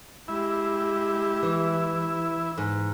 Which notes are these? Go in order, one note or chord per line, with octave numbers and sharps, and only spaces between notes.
G#3 E4 G4
E3
G#2